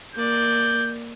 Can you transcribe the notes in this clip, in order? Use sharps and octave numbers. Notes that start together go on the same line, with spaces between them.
A#3 D5 G6